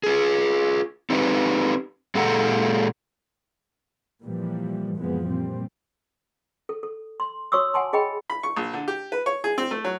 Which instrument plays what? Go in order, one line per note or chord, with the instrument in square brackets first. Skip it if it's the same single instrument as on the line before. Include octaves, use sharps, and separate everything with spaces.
[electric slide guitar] F4 G#4
C4 D#4 G4 B4
A#2 G#3 G4 A4 F#5 A#5
[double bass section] A#2 E3 F3 G3
F#1 A#2 E3 F3 G#3 B3
A#2 G3 C4
[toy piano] A4
A4
C6
F#4 C#5 C6 C#6 D#6 E6
F#5 G#5 A5 C6
G#4 D#5 G5 B5
[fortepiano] B5
C#6
A#1
D3
G4
B4
C#5
G#4
C4
A3
F#3